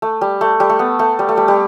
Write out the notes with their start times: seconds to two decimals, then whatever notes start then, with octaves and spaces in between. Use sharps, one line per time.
0.02 A3
0.21 G3
0.41 A3
0.60 G3
0.69 A3
0.79 B3
0.99 A3
1.19 G3
1.29 A3
1.37 G3
1.48 G3